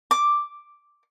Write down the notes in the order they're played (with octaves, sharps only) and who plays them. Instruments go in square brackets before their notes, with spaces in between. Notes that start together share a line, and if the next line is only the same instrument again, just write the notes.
[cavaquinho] D6